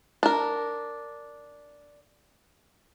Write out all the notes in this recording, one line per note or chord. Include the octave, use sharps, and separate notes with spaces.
D4 A#4